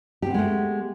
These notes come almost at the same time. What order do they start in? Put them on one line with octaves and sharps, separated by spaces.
G4 C4 B3 G#3 A3